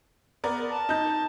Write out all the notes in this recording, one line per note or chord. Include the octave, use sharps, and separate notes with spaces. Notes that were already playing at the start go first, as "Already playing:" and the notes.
B3 A#4 D5
A5
D#4 G6